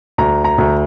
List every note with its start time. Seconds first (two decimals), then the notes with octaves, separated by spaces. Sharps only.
0.18 D2 A#5
0.44 A#5
0.58 D2